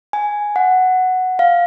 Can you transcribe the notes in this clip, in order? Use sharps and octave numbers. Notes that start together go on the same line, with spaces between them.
G#5
F#5
F5